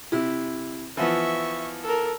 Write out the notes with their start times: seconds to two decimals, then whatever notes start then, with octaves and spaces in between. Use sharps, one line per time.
0.12 C3 E4
0.97 E3 F3 B3 E5 C#6
1.83 A4 A#4